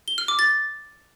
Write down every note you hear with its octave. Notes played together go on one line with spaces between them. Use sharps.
G7
F6
D6
A6